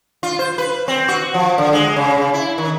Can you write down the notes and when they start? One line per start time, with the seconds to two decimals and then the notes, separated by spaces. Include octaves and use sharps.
0.23 F4
0.39 C5
0.58 B4
0.88 C4
1.08 F#4
1.34 F3
1.58 D3
1.73 G#3
1.96 C#3
2.18 C#3
2.34 E4
2.58 D#3